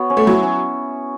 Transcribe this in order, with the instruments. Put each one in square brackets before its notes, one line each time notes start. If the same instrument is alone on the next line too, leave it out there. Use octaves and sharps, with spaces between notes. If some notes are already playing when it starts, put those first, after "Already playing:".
Already playing: [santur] B3 F#4 C#5
C#4
[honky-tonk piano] A3
[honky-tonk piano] F#3 [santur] E4
[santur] C#4